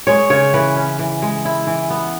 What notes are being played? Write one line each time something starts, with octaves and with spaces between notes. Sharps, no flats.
G#3 C#5
C#3 C#5
E3 B4
C#4
E3
G#3
E4
E3
B3